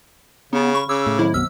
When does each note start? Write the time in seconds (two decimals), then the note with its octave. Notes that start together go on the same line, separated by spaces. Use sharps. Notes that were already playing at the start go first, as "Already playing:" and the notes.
0.53 C#3 B3 C#4
0.75 B5 C#6
0.89 C#3 D6 E6
1.06 A2
1.19 D#3 F#3 E4
1.34 B1 F#2 B3 E6 F6